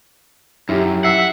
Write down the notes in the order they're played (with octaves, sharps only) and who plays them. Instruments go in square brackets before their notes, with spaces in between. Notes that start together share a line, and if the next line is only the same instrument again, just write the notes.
[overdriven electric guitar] F#2 [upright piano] E4 G4
[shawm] E5 [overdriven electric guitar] F#5 [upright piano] C7